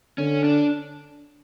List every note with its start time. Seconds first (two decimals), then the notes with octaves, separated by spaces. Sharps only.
0.18 D3 C#4
0.44 D4